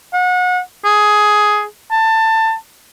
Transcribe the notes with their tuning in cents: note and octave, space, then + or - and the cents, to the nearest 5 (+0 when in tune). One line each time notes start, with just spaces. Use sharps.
F#5 -30
G#4 +10
A5 +20